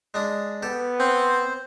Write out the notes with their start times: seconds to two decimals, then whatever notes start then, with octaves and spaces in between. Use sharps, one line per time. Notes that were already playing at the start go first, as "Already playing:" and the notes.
0.14 G#3 D4 D#6
0.63 B3 G4 A4
0.99 C4 C5